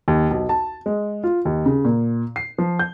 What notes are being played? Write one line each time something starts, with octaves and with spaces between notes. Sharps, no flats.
D#2
B1
A5
G#3
F4
D#2
C#3
A#2
C7
F3
G6